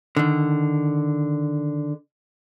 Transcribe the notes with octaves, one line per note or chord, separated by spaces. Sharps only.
D3 D#3